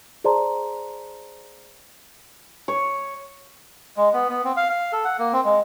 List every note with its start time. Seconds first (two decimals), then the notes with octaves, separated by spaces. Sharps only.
0.24 G#4 C5 D5 A5 A#5 C6
2.68 C#5
3.97 G#3
4.13 B3
4.30 B3
4.45 C4
4.57 F5
4.70 F5
4.93 A4
5.05 F#5
5.19 A#3
5.33 C4
5.45 G#3